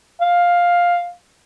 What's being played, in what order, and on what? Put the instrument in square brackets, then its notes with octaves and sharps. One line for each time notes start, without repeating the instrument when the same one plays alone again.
[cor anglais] F5